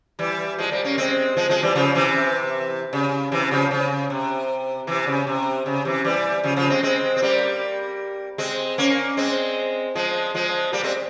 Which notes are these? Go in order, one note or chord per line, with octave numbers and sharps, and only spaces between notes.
E3 G3
F3 G#3
G3 A#3
A#3 C#4
G#3 C4
F3 G#3
F3 G#3
E3 G3
C#3 F3
C3 E3
C#3
C3 E3
C#3 F3
C#3
C3
C3 E3
C#3
C3
C#3
C3 E3
E3 G3
C#3 F3
C#3 F3
G#3 C4
G#3 C4
C4
G3 A#3
G#3 C4
A#3 C#4
G#3 C4
F3 G#3
F3 G#3
G3 A#3
G#3 C4